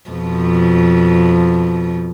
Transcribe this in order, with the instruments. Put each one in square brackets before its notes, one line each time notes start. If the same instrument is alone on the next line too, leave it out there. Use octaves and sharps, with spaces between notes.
[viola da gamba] F2 B2 F3